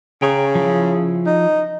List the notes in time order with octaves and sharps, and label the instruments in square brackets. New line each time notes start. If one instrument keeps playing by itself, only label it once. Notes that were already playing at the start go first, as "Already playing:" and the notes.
[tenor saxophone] C#3 [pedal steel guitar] G5 A#5 C#6
[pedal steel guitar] F3 E4
[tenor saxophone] D#4